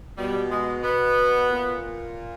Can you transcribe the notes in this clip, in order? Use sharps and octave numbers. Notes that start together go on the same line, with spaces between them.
B2 G3
G#3
B3
A#2